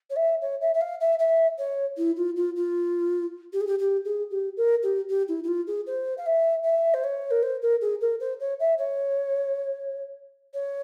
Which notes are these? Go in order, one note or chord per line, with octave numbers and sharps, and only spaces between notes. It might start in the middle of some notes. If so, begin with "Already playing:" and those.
C#5
E5
C#5
E5
E5
F5
E5
E5
C#5
E4
F4
F4
F4
G4
G#4
G4
G4
G#4
G4
A#4
G4
G4
E4
E4
F4
G#4
C5
F5
E5
E5
C5
C#5
A#4
C5
A#4
G#4
A#4
C5
C#5
E5
C#5
C#5